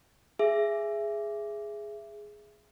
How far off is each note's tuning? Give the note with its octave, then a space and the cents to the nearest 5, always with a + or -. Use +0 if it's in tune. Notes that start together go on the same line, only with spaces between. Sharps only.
G#4 +0 E5 +20